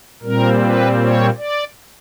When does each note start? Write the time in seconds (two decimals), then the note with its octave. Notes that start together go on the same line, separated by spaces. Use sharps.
0.23 A#2 G3 C4 A#4
0.62 B4
1.00 C#5
1.37 D5